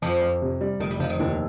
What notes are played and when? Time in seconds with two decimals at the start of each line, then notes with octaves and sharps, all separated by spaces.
0.02 F2 F3
0.22 F2
0.42 C3
0.61 G3
0.80 F1 D#3
0.91 G3
0.99 F1 F3
1.10 D#3
1.19 D#2 D3